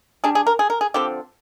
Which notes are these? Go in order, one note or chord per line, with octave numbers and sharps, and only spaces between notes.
G3 D4 G#4
G#4
A#4
G#4
A#4
G#4
D3 F3 C4 G4